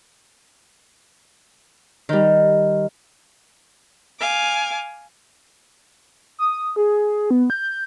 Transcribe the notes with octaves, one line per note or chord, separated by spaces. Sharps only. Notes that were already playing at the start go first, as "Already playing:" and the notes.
D#3 G3
F5 G#5 D6
D#6
G#4
B3
G6